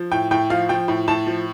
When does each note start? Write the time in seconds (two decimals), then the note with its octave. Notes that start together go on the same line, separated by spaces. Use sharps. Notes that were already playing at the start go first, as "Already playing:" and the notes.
Already playing: F3
0.11 A2 G5
0.31 A2 G5
0.50 F3 F5
0.69 F3 G5
0.88 A2
1.08 A2 A5
1.27 F3